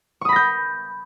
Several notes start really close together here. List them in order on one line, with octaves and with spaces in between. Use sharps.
C#6 D#6 B5 A#6 G6